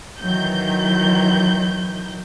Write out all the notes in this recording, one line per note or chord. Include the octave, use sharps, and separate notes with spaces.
D#3 E3 F#3 G6